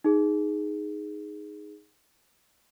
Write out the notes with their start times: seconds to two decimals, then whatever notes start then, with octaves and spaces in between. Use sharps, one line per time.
0.04 D#4 G#4